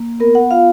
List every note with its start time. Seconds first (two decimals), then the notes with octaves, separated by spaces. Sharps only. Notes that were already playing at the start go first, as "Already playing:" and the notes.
Already playing: A#3
0.20 B3 A#4
0.35 F#5
0.51 F4 F5